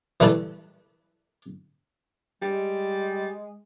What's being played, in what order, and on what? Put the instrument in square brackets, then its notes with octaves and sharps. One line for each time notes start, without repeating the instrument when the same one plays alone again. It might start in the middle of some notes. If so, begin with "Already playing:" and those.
[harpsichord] E3 G3 A3 A4
[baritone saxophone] G3 [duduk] G#3